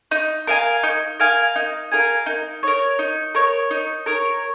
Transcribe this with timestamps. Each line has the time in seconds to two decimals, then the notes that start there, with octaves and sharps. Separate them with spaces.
0.11 D#4
0.47 A#4 F5 G#5
0.83 D#4
1.20 A#4 F5 G#5
1.56 D#4
1.92 A#4 F5 G#5
2.26 D#4
2.63 A#4 C#5
2.99 D#4
3.35 A#4 C#5
3.71 D#4
4.06 A#4 C#5